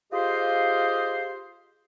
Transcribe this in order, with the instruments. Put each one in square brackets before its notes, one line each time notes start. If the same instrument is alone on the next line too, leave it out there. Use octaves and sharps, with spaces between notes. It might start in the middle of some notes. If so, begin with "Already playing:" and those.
[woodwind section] F4 G4 G#4 C5 D#5 F5